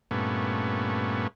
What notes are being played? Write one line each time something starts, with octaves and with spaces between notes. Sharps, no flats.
G2 A#2 A3 B3 C#4